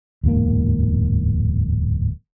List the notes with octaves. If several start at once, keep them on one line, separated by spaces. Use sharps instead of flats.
D1 E2 G#2 A#3